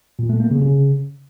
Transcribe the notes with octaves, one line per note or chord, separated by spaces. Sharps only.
A#2
A3
A#3
C#3
C#3